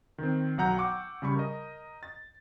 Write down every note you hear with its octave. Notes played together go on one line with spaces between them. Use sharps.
D#3 C4
B1 F#3 F#5 A#5 G6
F#5 G5 C#6 D6 E6
C#3 G3 B5 C#6
A#4 D#5
A6